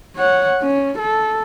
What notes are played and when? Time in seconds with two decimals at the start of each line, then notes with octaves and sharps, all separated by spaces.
0.16 C#5 F#5
0.61 C#4
0.98 A4